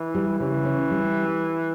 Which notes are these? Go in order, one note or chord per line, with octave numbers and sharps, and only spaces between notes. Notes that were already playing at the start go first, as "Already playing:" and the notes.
Already playing: E3
G3
C#3 E3
C#4
G3